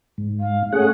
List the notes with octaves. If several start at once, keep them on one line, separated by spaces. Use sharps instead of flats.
G#2
F5
A3 C#4 G#4 F#5